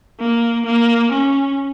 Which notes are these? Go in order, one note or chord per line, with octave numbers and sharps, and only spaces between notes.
A#3
A#3
C#4